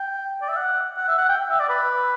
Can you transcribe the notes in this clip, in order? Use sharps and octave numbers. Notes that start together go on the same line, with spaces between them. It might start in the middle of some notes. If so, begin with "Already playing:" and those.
Already playing: G5
D5
E5
F#5
F#5
E5
F#5
G5
E5
D5
B4